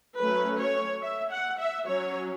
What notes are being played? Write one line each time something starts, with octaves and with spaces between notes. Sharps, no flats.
F#3 A3 C#4 B4
C#5
E5
F#5
E5
F#3 C#4 C#5